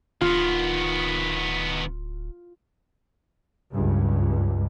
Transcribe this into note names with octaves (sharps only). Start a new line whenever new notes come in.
D1 D#3 B3 F4
C#2 G2